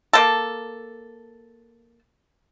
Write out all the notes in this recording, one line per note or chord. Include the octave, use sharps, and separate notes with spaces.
A#3 A4